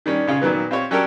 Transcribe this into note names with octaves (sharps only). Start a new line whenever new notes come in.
D#3 G3 C#4 D4
C#3 C#4 F4 G#4
A#2 D#3 F#3 B3
C4 F4 G4 C#5
F#3 C#4 D4 G4 A4 A#4